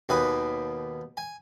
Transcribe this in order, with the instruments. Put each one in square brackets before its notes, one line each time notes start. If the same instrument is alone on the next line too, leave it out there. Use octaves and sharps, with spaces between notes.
[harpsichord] D#2 B2 B4 G#5
G#5